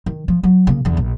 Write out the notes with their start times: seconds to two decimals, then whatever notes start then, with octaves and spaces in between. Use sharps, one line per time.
0.06 D#3
0.28 F3
0.43 F#3
0.67 C#3 A#3
0.85 E2 D3
0.97 A#1